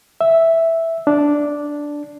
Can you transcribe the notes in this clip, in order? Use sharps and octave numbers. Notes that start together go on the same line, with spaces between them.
E5
D4